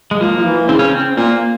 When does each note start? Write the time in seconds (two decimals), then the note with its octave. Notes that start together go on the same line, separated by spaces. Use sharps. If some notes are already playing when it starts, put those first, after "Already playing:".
0.11 G#3
0.21 F3 A#3
0.37 F3
0.45 E3
0.69 C#3 C4
0.79 C#4
0.89 C4
1.17 A#2 A#3